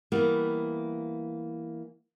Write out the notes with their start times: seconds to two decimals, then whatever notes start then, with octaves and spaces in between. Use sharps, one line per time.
0.12 E3 G3 A#3 B3